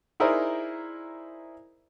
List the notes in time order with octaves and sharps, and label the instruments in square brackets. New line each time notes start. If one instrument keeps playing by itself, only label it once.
[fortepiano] D#4 E4 G#4 A#4 C5 D5